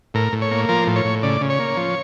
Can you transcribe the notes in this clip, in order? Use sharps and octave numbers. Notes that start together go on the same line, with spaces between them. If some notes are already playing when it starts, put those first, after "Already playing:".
A2 A#4
A2
C#5
A#3
F3 A#4
A2
C#5
A2
C#3 D5
C#3
C#5
A#3
F3